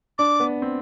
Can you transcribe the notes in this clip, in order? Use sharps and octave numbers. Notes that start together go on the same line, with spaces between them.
D4 D6
B3
C4